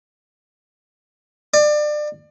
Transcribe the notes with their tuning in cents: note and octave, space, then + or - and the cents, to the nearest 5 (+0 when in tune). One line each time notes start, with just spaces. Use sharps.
D5 +30